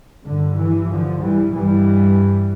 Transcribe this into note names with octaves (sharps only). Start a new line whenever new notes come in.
G2 D3
E3
D3 F3
E3 G3
G2 E3 G3